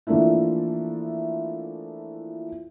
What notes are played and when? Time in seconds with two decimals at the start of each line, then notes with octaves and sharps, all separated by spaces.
0.07 E3 F3 A3 A#3 D4 E4